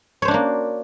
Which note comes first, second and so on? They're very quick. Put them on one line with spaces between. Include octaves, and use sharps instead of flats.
C#5 C5 D4 F#4 A#3